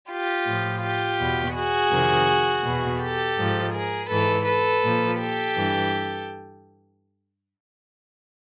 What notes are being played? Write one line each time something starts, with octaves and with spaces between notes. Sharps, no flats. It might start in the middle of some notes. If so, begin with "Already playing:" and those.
F4 G4
A2 F3
F4 G4
E2 B2
F#4 G#4
F2 C3 D#3
E2 B2
G4 A4
G#2 F3
G#4 A#4
G#2 E3 A4 B4
A4 B4
A#2 F3
G4 A4
G2 E3